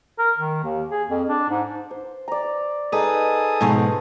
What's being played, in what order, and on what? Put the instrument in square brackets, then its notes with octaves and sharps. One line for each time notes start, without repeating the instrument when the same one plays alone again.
[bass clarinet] A#4
D#3
D#2
G#4
F2
D4
G#2
[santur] C5
D5 A#5
[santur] D#4 A#5 [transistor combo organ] G#4 A4 D#6 [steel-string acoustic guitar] B4
[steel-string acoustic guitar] G#2 B2 F3 [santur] A3 B3 G#5